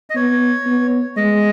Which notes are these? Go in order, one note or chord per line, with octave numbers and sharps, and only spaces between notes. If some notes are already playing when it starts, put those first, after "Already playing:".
D#5
B3 C#5
B3
G#3 D#5